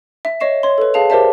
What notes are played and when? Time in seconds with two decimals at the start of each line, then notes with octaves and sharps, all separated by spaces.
0.25 E5
0.40 C#5 D#5 C#6 C7 E7
0.63 C#5 C6
0.78 A4 B4
0.94 G#4 F5 A5 F7
1.10 G4 A#4 C5 D5 E5 A5